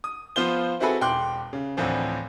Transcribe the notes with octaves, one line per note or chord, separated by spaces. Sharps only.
D#6
F3 B3 F4 C5 G7
C4 E4 F#4 G#4 A4 B4
E1 G5 C6 D6 F#6
C#3
D2 A2 E3 F3 C4